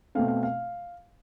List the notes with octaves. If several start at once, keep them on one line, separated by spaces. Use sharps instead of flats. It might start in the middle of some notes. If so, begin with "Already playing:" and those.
B2 A3 C4 F5
F5
F5